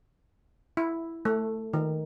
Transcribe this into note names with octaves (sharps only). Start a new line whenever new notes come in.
E4
A3
D#3